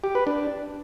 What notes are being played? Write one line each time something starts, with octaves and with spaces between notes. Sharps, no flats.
G4
B4
D4